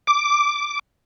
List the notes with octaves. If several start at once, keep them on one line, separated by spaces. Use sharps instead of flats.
D6